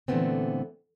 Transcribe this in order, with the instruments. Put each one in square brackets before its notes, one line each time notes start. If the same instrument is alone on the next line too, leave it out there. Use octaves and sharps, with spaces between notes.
[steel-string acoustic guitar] A#2 D3 E3 A3 B3 C4